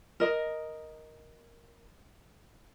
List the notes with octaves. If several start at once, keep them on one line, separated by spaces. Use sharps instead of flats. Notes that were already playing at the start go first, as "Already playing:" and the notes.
A#4 D#5